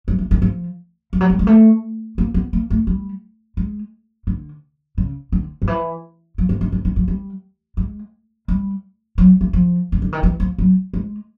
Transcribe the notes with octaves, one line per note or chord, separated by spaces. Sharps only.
F#3
E3
D#3
F3
F3
F#3
G3
G#3
A3
A#3
B3
A#3
A3
G3
G#3
D3
C#3
D3
D#3
E3
F3
E3
D3
D3
D#3
F3
G3
G#3
G3
F#3
E3
F3
C#3
D3
D#3
E3
F3
F#3
G#3